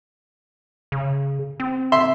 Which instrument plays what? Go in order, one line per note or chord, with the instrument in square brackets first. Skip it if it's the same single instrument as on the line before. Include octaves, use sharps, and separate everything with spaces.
[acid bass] C#3
C4
[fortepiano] E5 C6